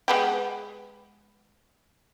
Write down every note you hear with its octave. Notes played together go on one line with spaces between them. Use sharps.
G#3 B3 G4